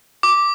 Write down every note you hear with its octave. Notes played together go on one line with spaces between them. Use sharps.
D6